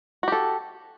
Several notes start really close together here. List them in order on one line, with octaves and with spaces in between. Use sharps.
F#4 G4 A4